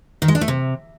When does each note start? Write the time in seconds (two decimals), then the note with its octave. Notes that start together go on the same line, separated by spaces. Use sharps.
0.22 D#3
0.28 G#3
0.35 D4
0.41 A3
0.48 C3